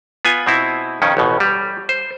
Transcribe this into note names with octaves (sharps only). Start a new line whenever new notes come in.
B3 F4 G#5
B2 C4 E4
F2 D#3 C#4
A1 B2
G3
C5